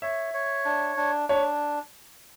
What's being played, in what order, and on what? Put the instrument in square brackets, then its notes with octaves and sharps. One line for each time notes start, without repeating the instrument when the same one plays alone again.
[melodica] C#5 [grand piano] E5
[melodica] C#5
D4
D4
[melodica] D4 [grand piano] C#5